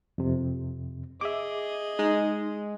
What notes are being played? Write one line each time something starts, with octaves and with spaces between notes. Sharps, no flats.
F2 C3
G#4 D#5 E5 D6
G#3 D#4